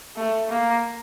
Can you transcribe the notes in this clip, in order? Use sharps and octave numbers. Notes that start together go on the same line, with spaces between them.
A3
A#3